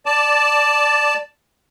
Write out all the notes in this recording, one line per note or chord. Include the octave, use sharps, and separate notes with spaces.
D5 A5